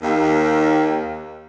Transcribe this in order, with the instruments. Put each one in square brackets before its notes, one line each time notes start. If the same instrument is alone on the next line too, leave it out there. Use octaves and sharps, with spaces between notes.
[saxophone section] D#2